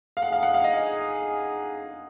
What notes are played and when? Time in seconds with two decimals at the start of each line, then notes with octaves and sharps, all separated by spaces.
0.17 F5
0.22 A#3 D#4 G#4 F#5
0.32 F5
0.43 F#5
0.54 F5
0.64 D#5